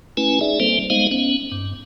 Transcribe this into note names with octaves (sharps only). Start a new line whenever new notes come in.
A3 C#4 E4 B4 G#5
D#4 G#4 D5 E5
G3 A#3 C4 A4 C5
G#3 B3 D#4 C5 D#5 F5
B3 C#4
G2